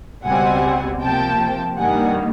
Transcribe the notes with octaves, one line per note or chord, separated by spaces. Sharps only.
C#2 B2 G3 C4 F#5 G#5
C3 F3 A#3 G5 A5
G2 D#3 G3 A#3 D#4 F#5 G#5